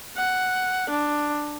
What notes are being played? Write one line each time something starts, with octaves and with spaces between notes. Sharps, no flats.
F#5
D4